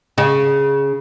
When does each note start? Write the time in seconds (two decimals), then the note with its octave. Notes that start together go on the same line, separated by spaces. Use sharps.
0.18 C#3